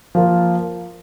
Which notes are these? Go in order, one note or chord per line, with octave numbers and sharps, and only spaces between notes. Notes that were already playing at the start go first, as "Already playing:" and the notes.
F3 A#3 F4